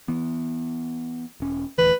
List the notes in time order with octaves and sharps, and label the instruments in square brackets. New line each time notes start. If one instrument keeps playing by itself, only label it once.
[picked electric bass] E3 B3
E1 C#4
[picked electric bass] D#1 D2 E3 [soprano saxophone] B4